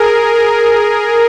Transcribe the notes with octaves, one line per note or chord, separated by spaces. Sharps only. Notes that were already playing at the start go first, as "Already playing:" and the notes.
Already playing: G#4 A#4
A#4